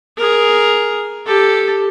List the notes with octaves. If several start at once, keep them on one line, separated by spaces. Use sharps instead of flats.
G#4 A#4
G4 A4